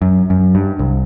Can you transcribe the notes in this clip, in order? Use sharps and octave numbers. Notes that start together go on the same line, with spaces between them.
F#2
F#2
G2
C2